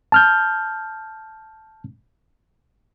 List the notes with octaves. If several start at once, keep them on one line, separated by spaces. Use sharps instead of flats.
A5 F6 G6